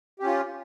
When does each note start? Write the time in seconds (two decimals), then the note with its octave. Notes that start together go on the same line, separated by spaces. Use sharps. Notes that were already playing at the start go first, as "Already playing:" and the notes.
0.19 G4
0.23 C#4
0.26 F4